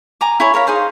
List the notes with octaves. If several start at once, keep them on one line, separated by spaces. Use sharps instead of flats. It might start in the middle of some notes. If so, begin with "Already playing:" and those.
G#5 A#5 D6
E4 C#5 G#5
A#4 C#5 F5 B5
D#4 G#4 C5 F5